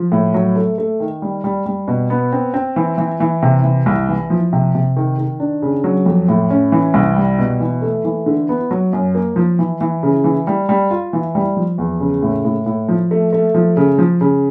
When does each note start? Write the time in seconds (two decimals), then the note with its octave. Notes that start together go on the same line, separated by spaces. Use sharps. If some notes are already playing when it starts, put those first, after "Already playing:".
Already playing: F3
0.12 A2
0.34 F#3
0.56 A3
0.78 A3
1.00 D#3
1.22 G3
1.44 G3
1.66 G3
1.88 B2
2.10 B3
2.33 C4
2.54 C4
2.76 E3
2.98 E3
3.20 E3
3.42 C3
3.64 E3
3.86 C2
4.09 E3
4.30 F3
4.53 C3
4.75 C3
4.97 D#3
5.18 D#3
5.40 D4
5.62 C#3
5.84 F#3
6.06 F2
6.28 A2
6.50 C#4
6.72 E3
6.94 C2
7.16 G3
7.39 B2
7.60 E3
7.82 A3
8.05 E3
8.26 D3
8.49 B3
8.71 F#3
8.93 F#2
9.15 A#3
9.36 F3
9.59 E3
9.81 E3
10.03 C#3
10.24 E3
10.47 G3
10.69 G3
10.91 F4
11.13 E3
11.35 G3
11.57 F3
11.78 E2
12.00 C#3
12.23 A2
12.45 A2
12.66 A2
12.89 F3
13.11 A3
13.33 A3
13.54 F3
13.77 C#3
13.98 F3
14.21 C#3